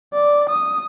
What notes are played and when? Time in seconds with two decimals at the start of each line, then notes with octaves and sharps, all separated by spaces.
0.13 D5
0.49 D#6